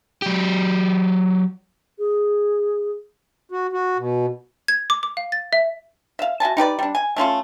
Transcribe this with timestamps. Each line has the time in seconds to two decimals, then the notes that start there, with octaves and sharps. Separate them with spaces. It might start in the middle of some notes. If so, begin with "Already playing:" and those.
0.22 F#3 G4
1.99 G#4
3.50 F#4
3.73 F#4
3.98 B2
4.68 G#6
4.90 D6
5.03 D6
5.17 F5
5.32 A6
5.53 E5
6.19 E5 F5
6.40 F#4 E5 G#5 A5
6.57 D#4 G4 B4 D5
6.79 G3 D4
6.95 G#5
7.17 A3 C#4 F4 A4